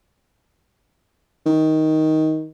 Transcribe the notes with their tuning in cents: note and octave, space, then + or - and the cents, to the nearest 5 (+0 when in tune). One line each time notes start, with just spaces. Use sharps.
D#3 +10